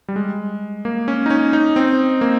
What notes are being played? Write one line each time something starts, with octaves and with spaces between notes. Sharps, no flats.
G3
G#3
A#3
C#4
D#4
C#4
D#4
C4
A#3